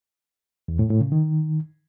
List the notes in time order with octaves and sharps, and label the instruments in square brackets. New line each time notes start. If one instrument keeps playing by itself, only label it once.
[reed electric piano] E2
A2
A2
C#3
D#3